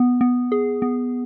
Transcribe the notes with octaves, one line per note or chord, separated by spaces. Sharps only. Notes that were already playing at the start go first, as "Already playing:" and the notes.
Already playing: B3
B3
G#4
B3